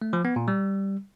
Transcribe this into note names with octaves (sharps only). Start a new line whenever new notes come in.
A3
F3
B3
A#2
G3